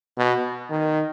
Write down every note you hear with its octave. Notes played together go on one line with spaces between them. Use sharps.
B2
D#3